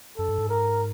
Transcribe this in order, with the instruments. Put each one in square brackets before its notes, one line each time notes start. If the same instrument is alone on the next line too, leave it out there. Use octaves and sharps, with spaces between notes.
[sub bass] F#2 [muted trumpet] A4
[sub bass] G2
G#2
[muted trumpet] A#4